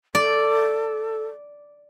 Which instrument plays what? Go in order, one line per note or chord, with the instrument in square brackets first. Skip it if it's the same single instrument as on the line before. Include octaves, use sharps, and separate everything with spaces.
[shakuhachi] A4 [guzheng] D5